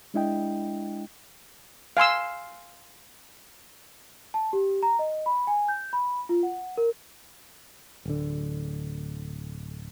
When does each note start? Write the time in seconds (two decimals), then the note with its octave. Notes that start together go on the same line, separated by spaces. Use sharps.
0.14 G#3 D4 E4 D#5 G5
1.97 F5 G#5 C6 E6
4.34 A5
4.53 G4
4.83 A#5
4.99 D#5
5.26 B5
5.47 G#5
5.68 G6
5.93 B5
6.29 F4
6.43 F#5
6.77 A#4
8.05 D1 D3